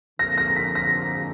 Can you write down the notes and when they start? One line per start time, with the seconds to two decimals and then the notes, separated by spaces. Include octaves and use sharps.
0.19 F2 D3 F3 A#3 A#6
0.38 A#6
0.56 B6
0.75 A#6